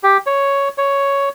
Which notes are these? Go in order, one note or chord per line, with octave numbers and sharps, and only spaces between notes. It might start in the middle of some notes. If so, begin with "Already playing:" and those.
G4
C#5
C#5